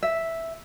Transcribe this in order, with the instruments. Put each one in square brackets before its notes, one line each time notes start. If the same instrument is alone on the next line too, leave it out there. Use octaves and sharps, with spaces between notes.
[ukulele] E5